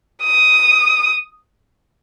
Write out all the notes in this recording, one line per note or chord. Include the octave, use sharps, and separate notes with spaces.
D#6